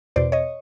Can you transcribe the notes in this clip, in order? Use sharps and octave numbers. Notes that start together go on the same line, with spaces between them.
E2 B2 C5 D5
C#5 D#5